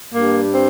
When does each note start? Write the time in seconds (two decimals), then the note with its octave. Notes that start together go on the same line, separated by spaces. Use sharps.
0.13 G2 G3 A#3
0.55 C4